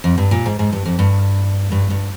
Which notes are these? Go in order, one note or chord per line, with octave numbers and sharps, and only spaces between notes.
F2
G2
A#2
G#2
G#2
G2
F2
G2
G2
G2